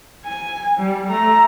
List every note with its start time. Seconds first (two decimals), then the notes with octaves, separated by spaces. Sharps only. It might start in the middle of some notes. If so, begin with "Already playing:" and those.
0.25 G#5
0.77 G3
1.09 A3 A#5